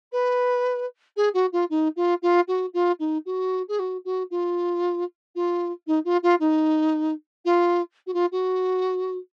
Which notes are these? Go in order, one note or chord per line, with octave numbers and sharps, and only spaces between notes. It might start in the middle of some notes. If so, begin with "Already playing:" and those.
B4
G#4
F#4
F4
D#4
F4
F4
F#4
F4
D#4
F#4
G#4
F#4
F#4
F4
F4
D#4
F4
F4
D#4
F4
F#4
F4
F#4